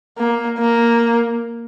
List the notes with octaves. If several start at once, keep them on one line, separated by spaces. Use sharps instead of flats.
A#3
A#3